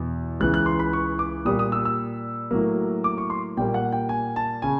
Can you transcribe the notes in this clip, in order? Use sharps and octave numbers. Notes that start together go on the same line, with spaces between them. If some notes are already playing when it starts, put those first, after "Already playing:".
Already playing: E2 B2
C#2 C#3 E3 F#6
F#6
C6
B5
C#6
D6
A#2 G3 A#3 D#6
D#6
E6
E6
A2 F#3 A#3
D6
C#6
C6
A#2 G3 A#3 G5
F#5
G5
G#5
A5
C#3 G#5